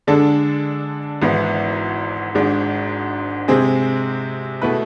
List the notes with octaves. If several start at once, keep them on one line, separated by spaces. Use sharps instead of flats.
D3 G#3 D4 A4
G#1 G#2 E3 B3 E4
G#1 G#2 G#3 D4
C3 G#3 C4 G#4
B2 A3 E4 B4